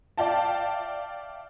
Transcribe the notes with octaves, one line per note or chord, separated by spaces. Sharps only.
D5 E5 F5 G5 A5